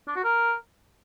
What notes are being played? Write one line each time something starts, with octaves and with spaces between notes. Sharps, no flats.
D4
F#4
A#4